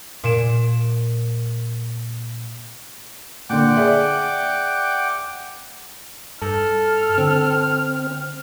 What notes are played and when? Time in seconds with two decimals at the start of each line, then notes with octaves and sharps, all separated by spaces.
0.23 A#2 D7 E7
3.50 A#2 D3 F#5 G5 D6
3.76 G#4 D5 E5
6.42 G2 A4 F6
7.18 D3 C4